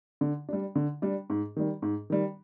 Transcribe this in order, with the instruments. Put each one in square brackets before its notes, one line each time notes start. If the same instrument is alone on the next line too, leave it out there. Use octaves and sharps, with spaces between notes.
[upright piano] D3
G3 D4
D3
G3 D4
G#2
D#3 G3
G#2
D#3 G3